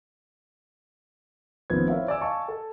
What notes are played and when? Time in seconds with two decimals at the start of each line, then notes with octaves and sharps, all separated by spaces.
1.70 A1 D#3 F3 B3 C4 G#6
1.88 E4 A#4 C5 C#5 E5 F5
2.08 D5 G#5 E6
2.21 D#5 F5 G#5 A5 C#6
2.48 A4